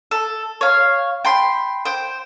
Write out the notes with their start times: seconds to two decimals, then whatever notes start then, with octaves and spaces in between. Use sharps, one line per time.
0.11 A4
0.61 C#5 F5
1.25 G5 B5 C6
1.85 C5 G5